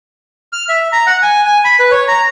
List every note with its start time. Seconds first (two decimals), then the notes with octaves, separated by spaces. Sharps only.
0.53 F6
0.69 E5
0.93 A#5
1.07 F#5
1.22 G#5
1.46 G#5
1.65 B5
1.80 B4
1.91 C#5
2.08 A#5